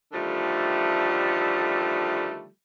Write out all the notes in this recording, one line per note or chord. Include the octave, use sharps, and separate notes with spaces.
D3 D#3 F3 G3 A3